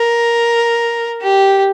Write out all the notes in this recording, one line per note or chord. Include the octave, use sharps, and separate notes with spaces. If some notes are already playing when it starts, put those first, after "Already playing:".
Already playing: A#4
G4